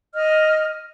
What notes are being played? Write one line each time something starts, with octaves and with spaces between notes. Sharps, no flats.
D#5 F6